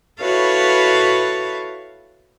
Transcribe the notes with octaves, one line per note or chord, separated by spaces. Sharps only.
E4 F#4 A4 B4 C#5 F5